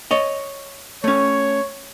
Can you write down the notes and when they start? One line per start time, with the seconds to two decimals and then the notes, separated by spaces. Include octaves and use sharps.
0.11 C#5 D#5
1.04 A3 C#4 C#5